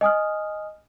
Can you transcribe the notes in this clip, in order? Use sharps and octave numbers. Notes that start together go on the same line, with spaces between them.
D#5 G#5 D#6 F6